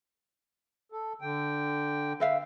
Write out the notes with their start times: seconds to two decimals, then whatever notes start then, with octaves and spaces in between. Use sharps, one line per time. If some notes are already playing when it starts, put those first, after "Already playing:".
0.92 A4
1.21 D3 G5
2.20 B4 E5 F5